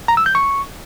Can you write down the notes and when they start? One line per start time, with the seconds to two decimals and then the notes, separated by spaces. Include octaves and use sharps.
0.08 A#5
0.17 E6
0.26 G6
0.35 C#6